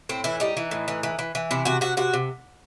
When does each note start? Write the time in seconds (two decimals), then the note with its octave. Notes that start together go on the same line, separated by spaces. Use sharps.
0.09 A2 C4
0.24 E3 E4
0.40 G3 D#4
0.57 E3
0.71 A2
0.88 E3
1.03 E3
1.19 E3
1.35 E3
1.51 C3 E4
1.65 C3 F#4
1.81 C3 F#4
1.97 C3 F#4
2.14 C3